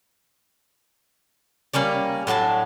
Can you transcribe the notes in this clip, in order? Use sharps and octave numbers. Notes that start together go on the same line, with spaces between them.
G3 A#3 C#4 D5
A2 F#3 D4 A5